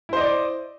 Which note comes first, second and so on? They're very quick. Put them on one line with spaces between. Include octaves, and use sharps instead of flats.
E4 C5 D#5 D5